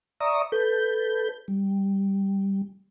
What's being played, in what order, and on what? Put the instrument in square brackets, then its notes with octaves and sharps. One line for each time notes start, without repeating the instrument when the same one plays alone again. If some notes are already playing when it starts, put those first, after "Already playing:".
[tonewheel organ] D5 E5 A#5 C#6 D#6
A4 B4 G6
G3